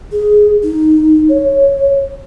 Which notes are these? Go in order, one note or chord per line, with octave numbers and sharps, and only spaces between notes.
G#4
D#4
C#5